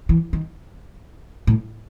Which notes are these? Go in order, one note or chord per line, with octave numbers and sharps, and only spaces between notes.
E3
D#3
A2